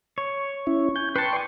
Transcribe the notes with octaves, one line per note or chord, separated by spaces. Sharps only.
C#5
C#4 E4
G#5 G6
B4 G5 A5 C6 C#6
D5 G#5